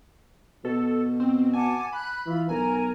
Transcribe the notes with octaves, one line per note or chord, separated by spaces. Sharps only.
B2 A4
C4
F#5 G#5 A5 D6
B5 F#6
E3 F4
B1 A#4 G#5 A#5